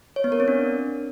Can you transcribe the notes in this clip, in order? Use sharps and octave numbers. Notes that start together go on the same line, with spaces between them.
C#5
B3
A#4
C4
D4